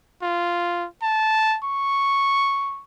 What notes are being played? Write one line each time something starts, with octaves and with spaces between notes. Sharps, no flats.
F4
A5
C#6